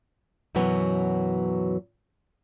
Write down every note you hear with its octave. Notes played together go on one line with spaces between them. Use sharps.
F#2 B2 E3 F#3 B3 C#4